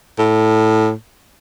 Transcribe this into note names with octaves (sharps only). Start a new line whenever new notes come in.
A2